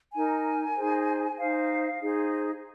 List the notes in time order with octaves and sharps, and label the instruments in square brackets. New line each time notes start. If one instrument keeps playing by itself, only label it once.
[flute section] D#4 A#4 G#5
D#4 G#4 C5
D#4 C5 F5
D#4 G#4 C5